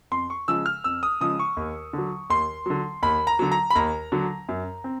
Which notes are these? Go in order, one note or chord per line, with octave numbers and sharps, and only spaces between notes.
F2 C6
C#6
C#3 F3 G#3 E6
F6
F2 E6
D#6
C#3 F3 G#3 D#6
C#6
D#2
D3 F#3
D#2 C6
D3 F#3
D#2 B5
A#5
D3 F#3
A#5
B5
D#2 A#5
D3 F#3
F#2
C4